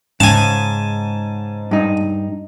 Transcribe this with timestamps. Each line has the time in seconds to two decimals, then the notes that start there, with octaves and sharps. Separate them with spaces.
0.20 G#2 C#3 G#5 A5
1.71 G2 D#4